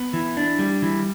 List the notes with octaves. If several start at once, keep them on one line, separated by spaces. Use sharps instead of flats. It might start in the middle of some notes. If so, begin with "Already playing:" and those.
Already playing: B3
E3
D4
G3
E3